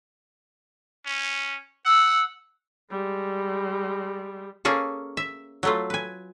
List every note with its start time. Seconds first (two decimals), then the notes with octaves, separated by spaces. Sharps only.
1.06 C#4
1.86 F#5 E6
2.91 G3 G#3
4.65 A#3 C#4 G#4 A4
5.17 E5
5.63 F#3 A3 F4
5.90 B4 G#5